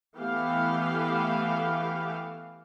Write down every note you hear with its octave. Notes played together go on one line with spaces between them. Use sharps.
E3 A3 B3 G4 F5